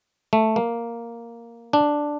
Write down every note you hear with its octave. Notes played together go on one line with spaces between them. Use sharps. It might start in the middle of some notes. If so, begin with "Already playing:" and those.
A3
A#3
D4